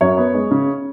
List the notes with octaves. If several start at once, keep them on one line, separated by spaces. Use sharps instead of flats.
F#2 C#5
B3
G#3
C#3